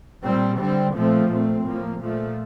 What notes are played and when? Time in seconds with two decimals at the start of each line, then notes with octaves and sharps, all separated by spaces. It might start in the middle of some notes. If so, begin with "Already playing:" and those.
0.23 A#2 G3 C4
0.59 D3 G3 C4
0.94 A#2 F3 A3 C4
1.29 A#2 A3 C4
1.64 A2 F3 A#3
1.99 A#2 F3 A3